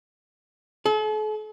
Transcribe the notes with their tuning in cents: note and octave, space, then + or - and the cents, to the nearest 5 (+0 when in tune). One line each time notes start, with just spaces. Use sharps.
A4 -45